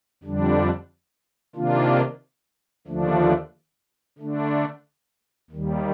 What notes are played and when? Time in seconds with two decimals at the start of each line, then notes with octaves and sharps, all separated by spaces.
0.24 F2 D3 G3 D4
1.55 C3 D#3 A#3 D4 F4
2.87 D#2 D3 F3 A3 D4
4.19 D3 A3 D4
5.51 D#2 D#3 G3